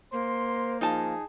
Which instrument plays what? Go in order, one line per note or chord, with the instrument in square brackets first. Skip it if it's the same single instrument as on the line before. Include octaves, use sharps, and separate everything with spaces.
[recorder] A#3 [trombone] C5 [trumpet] C6
[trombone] F3 [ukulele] D#4 A5 [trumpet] G#4